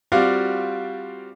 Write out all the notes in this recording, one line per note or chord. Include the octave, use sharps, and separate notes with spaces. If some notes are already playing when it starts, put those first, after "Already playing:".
G3 C4 F4 F#4 D5 F5